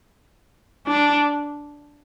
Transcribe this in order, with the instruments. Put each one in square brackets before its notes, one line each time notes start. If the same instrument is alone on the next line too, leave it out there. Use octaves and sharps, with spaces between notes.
[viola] D4